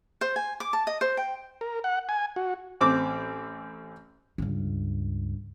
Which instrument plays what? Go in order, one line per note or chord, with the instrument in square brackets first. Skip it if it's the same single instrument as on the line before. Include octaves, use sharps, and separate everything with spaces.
[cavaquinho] C5
G#5
D6
A5
D#5
C5
G5
[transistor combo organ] A#4
F#5
G#5
F#4
[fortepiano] A1 C4 D6
[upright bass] C#2 G2